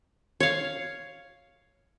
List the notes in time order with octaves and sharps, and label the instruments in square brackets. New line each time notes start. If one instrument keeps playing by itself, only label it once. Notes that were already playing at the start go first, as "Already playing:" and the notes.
[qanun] C#5 F5